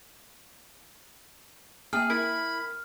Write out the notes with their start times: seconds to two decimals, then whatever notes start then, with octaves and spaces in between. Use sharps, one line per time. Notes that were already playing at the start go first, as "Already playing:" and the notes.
1.93 A#3 G#4 E5 G5 F6
2.10 E4 A#4 B5